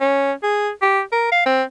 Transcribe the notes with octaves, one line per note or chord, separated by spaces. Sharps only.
C#4
G#4
G4
A#4
F5
C4